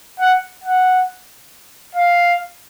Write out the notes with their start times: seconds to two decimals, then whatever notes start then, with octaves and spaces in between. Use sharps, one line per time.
0.19 F#5
0.64 F#5
1.95 F5